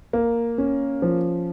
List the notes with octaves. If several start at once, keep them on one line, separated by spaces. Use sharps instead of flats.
A#3
C#4
F3